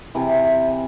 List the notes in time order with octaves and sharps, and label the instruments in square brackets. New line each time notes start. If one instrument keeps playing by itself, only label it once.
[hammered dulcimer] C3 E3